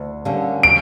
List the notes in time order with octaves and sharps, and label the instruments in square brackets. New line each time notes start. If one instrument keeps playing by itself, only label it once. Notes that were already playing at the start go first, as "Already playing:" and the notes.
Already playing: [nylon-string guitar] D2
D3 G3 A#3 C#4
[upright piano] D7